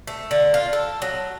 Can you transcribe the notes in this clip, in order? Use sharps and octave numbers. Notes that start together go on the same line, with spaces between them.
A3
D3
F4
A4
F#3